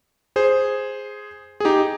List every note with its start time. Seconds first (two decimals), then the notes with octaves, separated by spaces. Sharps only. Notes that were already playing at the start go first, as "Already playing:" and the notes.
0.36 G#4 C5
1.60 G#4
1.65 D#4 G4